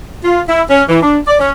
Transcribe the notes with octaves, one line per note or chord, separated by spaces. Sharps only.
F4
E4
C#4
E3
D4
D5
C#4